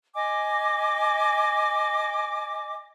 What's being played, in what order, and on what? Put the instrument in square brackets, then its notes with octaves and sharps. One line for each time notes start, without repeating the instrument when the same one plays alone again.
[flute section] D#5 G#5 D6